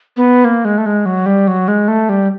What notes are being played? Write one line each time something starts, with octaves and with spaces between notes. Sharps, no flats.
B3
A#3
G#3
A3
G#3
F#3
G3
F#3
G#3
A3
G3